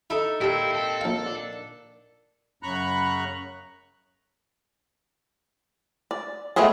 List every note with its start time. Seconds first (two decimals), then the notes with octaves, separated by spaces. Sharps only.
0.10 D#4 E4 A4 E5
0.41 A#2 C4 E4 G4 A5
0.75 A4
1.01 A#1 F5
1.25 D4
2.63 F#2 C#3 A#5 B5 C#6 F#6
6.11 D5
6.56 G#3 A3 B3 C4 G#4